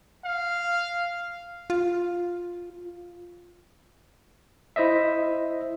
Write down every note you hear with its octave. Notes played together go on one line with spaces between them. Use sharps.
F5
F4
E4 C5 D#5 E5